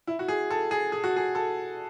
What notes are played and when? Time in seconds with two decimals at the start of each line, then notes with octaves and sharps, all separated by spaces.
0.07 E4
0.19 F#4
0.28 G#4
0.51 A4
0.71 G#4
0.92 G#4
1.04 F#4
1.16 G#4
1.35 A4